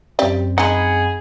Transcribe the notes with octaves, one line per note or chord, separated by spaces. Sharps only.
F#2 G3 C4 G4 D5
G#3 D#4 G#4 F#5 G#5 B5